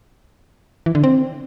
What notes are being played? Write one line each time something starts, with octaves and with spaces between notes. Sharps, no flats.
E3
D3
C4